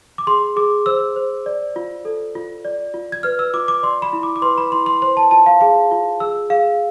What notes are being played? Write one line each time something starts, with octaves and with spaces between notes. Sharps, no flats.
D6
G#4 C6
G#4 D6
C5 E6
C5
D5
F4
A4
F4
D5
F4
G#6
B4 F6
E6
F4 D6
D6
D5 C6
B5
E4
D6
D6
B4 C6
B5
E4 C6
C6
C5 C6
A5
F4 A5
F5
G#4 F5
F4
G#4 E6
G#4 F5